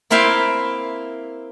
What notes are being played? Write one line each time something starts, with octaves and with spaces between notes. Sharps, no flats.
A#3 C4 E4 E5 F5 G5